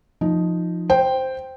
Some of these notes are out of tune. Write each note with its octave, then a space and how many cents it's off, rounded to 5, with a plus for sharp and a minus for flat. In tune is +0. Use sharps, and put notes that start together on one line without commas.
F3 +0 D#4 +0
C5 +0 G5 +0